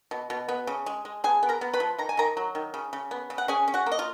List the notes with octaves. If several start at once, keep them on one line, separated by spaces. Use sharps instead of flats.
B2
B2
B3
C#3
G#3
G#3
B3 G#4 G#5
B3
A#4 A#5
B3
B4 B5
F3
D#3 A#5
G#5
D#3 A#4 A#5
F#3
D#3
C#3
C#3
B3
C#3
F#5
C#4 G#4 G#5
C#4
F#4 F#5
A#3
D#5
F4